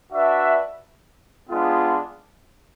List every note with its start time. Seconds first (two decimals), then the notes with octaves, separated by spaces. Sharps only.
0.12 D4 F#4 B4 E5
1.50 G#3 B3 D4 F4